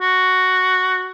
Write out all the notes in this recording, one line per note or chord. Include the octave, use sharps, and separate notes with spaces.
F#4